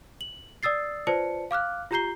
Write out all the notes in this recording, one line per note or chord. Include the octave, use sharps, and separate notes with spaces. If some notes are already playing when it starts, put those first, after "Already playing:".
F#7
D5 D#6 E6 A6 C7
F4 B4 C5 D5 A5 C#7
F5 D6 F6 F#6
F4 G4 A#5 G6 C7 G7